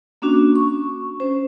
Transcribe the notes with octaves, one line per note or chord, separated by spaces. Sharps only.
A#3 C#4 D4 F#4
C#6
C#4 C5